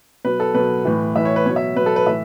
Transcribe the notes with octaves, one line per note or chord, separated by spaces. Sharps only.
B2 F#3 B4
A4
B2 F#3 B4
A2 E3
A2 E3 E5
C#5
B4
B2 F#3 C#5
E5
B2 F#3 B4
A4
B4
A2 E3 E5